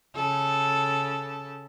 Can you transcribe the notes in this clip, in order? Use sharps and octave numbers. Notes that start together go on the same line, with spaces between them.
C#3 A4